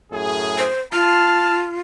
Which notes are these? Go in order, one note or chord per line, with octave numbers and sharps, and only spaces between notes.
F#2 A2 G#4
C5
F4 A5 F6